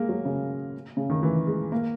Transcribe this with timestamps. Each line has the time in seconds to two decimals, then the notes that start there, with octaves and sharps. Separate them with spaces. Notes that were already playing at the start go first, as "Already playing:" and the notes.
Already playing: G#3 A#3
0.09 F#3
0.25 C#3
0.97 C#3
1.10 D#3
1.23 E3
1.47 G#3
1.72 A#3